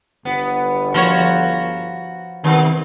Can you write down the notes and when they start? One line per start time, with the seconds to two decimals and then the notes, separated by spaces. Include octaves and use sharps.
0.25 G1 B3
0.94 F3 F#4 A#4 C#5
2.44 C2 D#3 B3